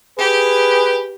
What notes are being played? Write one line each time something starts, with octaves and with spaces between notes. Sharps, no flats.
G4 G#4 B4